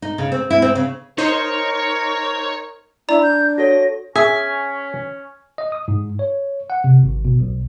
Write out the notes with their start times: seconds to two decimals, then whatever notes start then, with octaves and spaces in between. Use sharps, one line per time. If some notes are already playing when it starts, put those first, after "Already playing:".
0.02 D#4
0.18 C#3
0.32 C4
0.50 E4
0.62 C4
0.75 C#3
1.18 D#4 A#4 C5 C#5
3.09 D4 E4 D5 A#5
3.23 G6
3.58 F#4 A4 C#5 A#6
4.16 C#4 G#4 E5 G#5 B6
5.58 D#5
5.72 D#6
5.88 G#2
6.19 C#5
6.70 F#5
6.84 C3
7.03 G#1
7.25 B2
7.40 B1